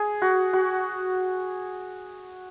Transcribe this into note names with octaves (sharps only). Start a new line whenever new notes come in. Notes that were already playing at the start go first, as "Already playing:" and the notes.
Already playing: G#4
F#4
F#4